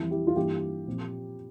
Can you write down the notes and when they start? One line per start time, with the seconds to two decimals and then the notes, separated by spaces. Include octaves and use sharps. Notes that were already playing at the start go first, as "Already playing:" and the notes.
Already playing: F2 E3 G3 C4 E4
0.11 E4 G4
0.27 F4
0.36 G2 E3 A#3 E4 G4
0.87 A#2 F3 C4